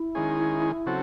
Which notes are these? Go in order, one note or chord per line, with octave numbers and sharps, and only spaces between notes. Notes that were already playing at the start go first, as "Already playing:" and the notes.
Already playing: E4
D#3 G#3 C#4 G#4
C#3 F#3 C4 F#4 A4